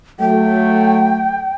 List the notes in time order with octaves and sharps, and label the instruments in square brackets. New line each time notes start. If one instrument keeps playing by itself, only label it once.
[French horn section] F#3 A3 [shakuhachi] G5